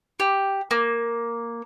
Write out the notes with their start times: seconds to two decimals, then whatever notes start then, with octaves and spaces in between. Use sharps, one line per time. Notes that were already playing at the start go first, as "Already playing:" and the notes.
0.20 G4
0.71 A#3